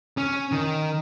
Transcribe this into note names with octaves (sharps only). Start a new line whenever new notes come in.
C#4
D#3